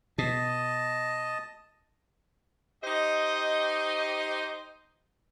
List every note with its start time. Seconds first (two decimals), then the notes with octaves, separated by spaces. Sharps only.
0.18 B2 D#5 A5
2.84 D#4 G4 C5 D#5